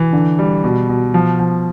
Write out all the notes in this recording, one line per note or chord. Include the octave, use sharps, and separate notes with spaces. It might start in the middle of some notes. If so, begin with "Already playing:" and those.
Already playing: E3
D3
G3
B2
B2
F3
F3